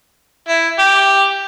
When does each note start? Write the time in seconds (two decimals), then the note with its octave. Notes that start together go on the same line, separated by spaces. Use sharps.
0.48 E4
0.79 G4